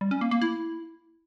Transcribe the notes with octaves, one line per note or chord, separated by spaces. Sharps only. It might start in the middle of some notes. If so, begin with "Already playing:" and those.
G3
C#4
A#3
A#3
E4